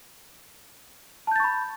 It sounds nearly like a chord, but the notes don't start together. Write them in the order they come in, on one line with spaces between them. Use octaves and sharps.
A5 G6 A6 C#6 B5